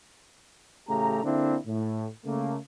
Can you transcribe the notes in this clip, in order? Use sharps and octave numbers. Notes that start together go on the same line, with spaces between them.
A1 C#3 A3 G4 A#5
D3 A#3 C4 D4 E4
A2
C#3 A3 A#3